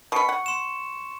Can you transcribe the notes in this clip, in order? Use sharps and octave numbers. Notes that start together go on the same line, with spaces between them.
B2 B5 C#6 C#7
F#5
C6 E7